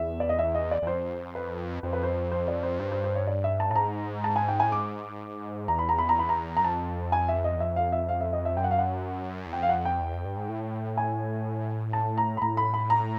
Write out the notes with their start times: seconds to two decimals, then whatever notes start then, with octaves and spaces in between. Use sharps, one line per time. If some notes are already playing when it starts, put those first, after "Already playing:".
Already playing: E2 E5
0.20 D5
0.29 D#5
0.39 E5
0.55 D#5
0.71 D5
0.82 E2
0.87 F2 C5
1.35 B4
1.83 F2 C5
1.93 B4
2.03 C5
2.32 C5
2.48 D5
2.63 C5
2.80 G2 C5
2.92 C5
3.04 C5
3.16 C#5
3.27 D5
3.44 E5
3.60 A5
3.71 A2 A5
3.76 G#2 A#5
4.24 A5
4.36 G#5
4.48 G5
4.60 A2 G#5
4.72 G#2 D6
5.68 E2 A#5
5.79 B5
5.89 A#5
5.98 B5
6.09 A#5
6.19 B5
6.29 A#5
6.57 F#2 A#5
6.64 F2 A5
7.12 G#5
7.29 E5
7.44 D#5
7.56 E2
7.60 F2 E5
7.76 F5
7.92 E5
8.09 F5
8.21 E5
8.33 D#5
8.45 E5
8.57 F#2 G5
8.64 F#5
8.71 F5
8.79 F#5
9.46 E2
9.53 F2 G5
9.63 F5
9.69 F#5
9.85 G5
10.01 E2
10.14 F2
10.25 G2
10.37 G#2
10.49 A2
10.98 G#5
11.93 A5
12.17 A#5
12.37 B5
12.42 A2 A#5
12.57 B5
12.74 B5
12.90 A#5